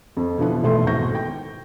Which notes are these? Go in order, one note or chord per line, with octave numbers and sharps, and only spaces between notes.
F2
B2 D3 E3 F3 B3
E1 B1 E3 A3 A4 C6
G#1 B2 C#6 G6 A#6
G5